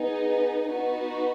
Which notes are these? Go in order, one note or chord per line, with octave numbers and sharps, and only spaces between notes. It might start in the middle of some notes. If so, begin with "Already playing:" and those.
Already playing: B3 D#4 G#4
B3 D#4 F#4 B4